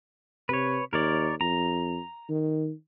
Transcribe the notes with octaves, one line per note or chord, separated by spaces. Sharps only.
C3 B4 C#5
D#2 A#4 C#5 D5
F2 A#5
D#3